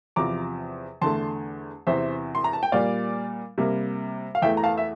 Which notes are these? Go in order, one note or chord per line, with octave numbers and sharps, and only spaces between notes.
E2 C3 F3 A#5 D6
E2 D3 A3 A5 C6
E2 C3 E3 C5 E5
C6
A#5
A5
G5
A#2 G3 A#3 D5 F5
C3 G3 A#3
F5
E2 E3 A3 E5 G5
A#5
F5 A5
E5